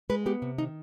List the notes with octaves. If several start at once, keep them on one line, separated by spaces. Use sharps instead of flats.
G#3 B4
B3 G4
C3
D#3 D#4